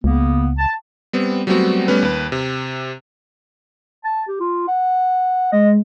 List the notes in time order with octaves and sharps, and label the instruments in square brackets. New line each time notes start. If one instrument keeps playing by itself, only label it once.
[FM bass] C#2 [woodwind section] C#3 A#3 B3
[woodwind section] A5
[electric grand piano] G3 B3 C4
F#3 G3 A3 B3 C4 F#4
G3 A3 B3 C#4 B4
D#2 B4
C3
[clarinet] A5
G4
F4
F#5
[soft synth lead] G#3 [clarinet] D#5